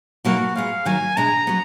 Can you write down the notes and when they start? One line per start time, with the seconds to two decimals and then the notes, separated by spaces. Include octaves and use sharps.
0.25 B2 F#3 A#3 D#4 F#4 A#4
0.56 A#2 G#3 B3 F5
0.85 D#3 F#3 A#3 G#5
1.17 B2 G#3 D4 A#5
1.47 F#3 B3